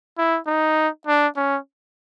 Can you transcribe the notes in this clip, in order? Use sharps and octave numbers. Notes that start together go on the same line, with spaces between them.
E4
D#4
D4
C#4